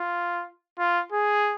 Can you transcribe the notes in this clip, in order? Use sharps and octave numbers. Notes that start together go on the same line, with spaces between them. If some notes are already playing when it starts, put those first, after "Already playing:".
Already playing: F4
F4
G#4